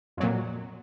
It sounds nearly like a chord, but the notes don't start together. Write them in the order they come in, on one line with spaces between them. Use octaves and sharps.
F2 F#3 A#2